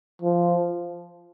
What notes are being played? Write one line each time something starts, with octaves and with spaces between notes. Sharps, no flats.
F3